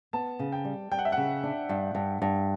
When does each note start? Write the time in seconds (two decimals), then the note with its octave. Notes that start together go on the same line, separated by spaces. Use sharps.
0.13 B3 A5
0.39 C#3
0.52 G5
0.65 G3
0.91 G3 G5
0.99 F#5
1.05 E5
1.12 C#3 F#5
1.43 D4
1.69 G2
1.95 G2
2.22 G2